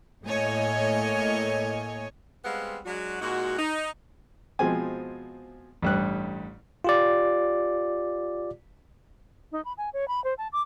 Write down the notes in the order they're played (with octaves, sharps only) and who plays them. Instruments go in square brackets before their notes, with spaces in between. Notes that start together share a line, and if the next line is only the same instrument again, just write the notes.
[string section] A2 A3 A#3 C#5 D#5 G#5
[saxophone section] G3 G#3 B3 C4 F5 F#5
F#3 G#3 D4 F#4
A#2 G#3 D#4 F#4
D#4
[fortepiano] B2 F3 G#3 C4 G#5
A1 G2 F#6
[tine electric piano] F4 G4 D5
[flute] D#4
B5
G#5
C#5
B5
C5
A5
D6